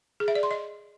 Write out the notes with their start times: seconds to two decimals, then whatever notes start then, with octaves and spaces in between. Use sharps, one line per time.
0.20 G#4
0.28 E5
0.35 D5
0.43 C6
0.51 D#5